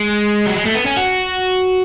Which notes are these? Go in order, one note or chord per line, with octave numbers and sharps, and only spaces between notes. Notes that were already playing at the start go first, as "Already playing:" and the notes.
Already playing: G#3
F#3
G#3
A3
B3
C#4
F#4